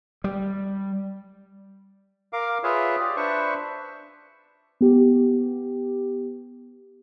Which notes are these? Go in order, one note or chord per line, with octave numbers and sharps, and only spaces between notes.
G3
A#4 F5 D6
F4 G#4 B4 C#5 E5
G4 D5
D4 B4 C5 E5 C#6
B3 G4